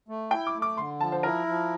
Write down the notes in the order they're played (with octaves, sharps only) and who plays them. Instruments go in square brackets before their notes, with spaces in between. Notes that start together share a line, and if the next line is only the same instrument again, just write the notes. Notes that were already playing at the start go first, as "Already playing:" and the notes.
[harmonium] A3
[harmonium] E4 [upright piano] G5
[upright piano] D6
[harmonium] A3
[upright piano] D6
[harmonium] D3 [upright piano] C6
[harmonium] F3 [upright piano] A5
[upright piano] C5
[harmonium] E4 [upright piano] A#4
[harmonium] F3